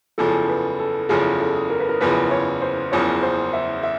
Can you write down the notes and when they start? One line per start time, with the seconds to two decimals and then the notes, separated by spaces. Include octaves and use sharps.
0.18 F#1 E2 C#3 F3 A4
0.49 B4
0.79 A4
1.09 F#1 E2 C#3 F3 G#4
1.40 A4
1.70 A#4
1.80 B4
1.89 A#4
2.01 F#1 E2 C#3 F3 B4
2.31 C#5
2.62 C5
2.92 F#1 E2 C#3 F3 C#5
3.23 C5
3.53 E5
3.83 E5